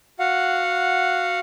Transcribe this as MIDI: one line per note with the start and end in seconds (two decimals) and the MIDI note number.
0.19 1.40 66
0.19 1.40 77
0.19 1.40 78